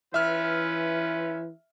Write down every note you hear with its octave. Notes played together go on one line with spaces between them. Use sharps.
E3 C#4 F4 B4 E5 F6